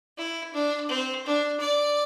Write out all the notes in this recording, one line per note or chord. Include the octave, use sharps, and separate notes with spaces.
E4
D4
C4
D4
D5